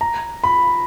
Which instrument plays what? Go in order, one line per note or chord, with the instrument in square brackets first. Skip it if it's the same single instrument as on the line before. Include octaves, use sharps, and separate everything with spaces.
[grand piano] A#5
B5